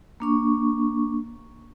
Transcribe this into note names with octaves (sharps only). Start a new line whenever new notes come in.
A#3 D4 C#6